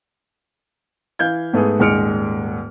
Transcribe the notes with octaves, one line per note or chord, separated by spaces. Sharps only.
E3 F5 G6 G#6
G#2 A3 B3 G#4
D#1 G#2 G#3 F6 C#7 D7